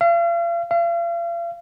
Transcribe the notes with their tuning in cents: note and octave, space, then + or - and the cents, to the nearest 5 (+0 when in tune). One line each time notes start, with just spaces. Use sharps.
F5 -40
F5 -40